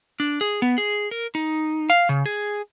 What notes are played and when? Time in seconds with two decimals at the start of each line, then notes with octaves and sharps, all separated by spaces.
0.20 D4
0.41 G#4
0.62 B3
0.78 G#4
1.11 A#4
1.35 D#4
1.90 F5
2.09 C#3
2.26 G#4